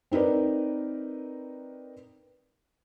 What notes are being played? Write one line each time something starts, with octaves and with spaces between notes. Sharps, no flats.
C4 D#4 A#4 B4 D5